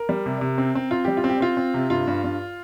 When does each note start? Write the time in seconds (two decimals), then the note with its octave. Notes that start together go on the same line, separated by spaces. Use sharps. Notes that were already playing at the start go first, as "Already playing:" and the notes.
Already playing: A#4
0.09 G3
0.26 C3
0.41 C3
0.58 C4
0.75 C4
0.91 C4 F4
1.05 G3 G4
1.17 F4
1.24 C4
1.29 G4
1.41 C4 F4
1.57 C4
1.74 C3
1.90 G2 F4
2.07 G2
2.24 G2